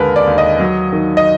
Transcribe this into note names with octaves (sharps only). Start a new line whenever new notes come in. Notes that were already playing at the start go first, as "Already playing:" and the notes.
Already playing: D#2 D3 G#3 A#4 B4
D5
D#2
D#5
F#3
D#3
D#5